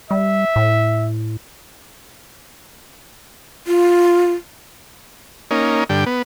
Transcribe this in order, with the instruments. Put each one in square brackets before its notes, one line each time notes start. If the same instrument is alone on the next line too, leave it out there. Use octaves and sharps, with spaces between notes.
[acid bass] G3 [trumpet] E5
[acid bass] A2
[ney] F4
[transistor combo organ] A#3 C#4 D#4
G2 D3 G5
B3